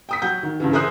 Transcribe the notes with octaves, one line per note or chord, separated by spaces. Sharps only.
G5 D#6 B6
F#3 F#5 G6
D#3
G2 C#3 E3
G#4 A#4 C5 E5 D#6 F#6